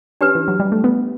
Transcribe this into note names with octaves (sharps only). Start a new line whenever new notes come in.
C#4 D4 G4 B4
E3
F#3
G3
A3
B3